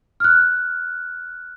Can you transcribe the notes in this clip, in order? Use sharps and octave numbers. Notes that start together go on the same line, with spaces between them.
F6 F#6